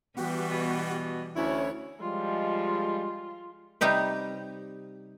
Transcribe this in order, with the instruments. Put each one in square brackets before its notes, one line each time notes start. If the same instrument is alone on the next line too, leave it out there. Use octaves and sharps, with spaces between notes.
[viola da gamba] E3 G3 [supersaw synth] B3 F#4 G4
[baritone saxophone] B2
[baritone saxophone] D2 [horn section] C#4 E4 [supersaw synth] C#5
[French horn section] F3 G3 G#3 [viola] F4
[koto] C3 G3 D#4 G4 B4